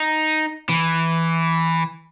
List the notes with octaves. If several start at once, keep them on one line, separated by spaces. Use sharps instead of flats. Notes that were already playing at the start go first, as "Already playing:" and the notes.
Already playing: D#4
E3